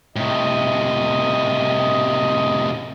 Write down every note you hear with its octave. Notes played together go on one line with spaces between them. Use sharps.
A2 C3 D#5